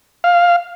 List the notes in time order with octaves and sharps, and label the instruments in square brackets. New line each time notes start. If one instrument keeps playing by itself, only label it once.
[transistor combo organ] F5